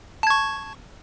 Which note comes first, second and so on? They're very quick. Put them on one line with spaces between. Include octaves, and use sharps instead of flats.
A5 G#6 C#6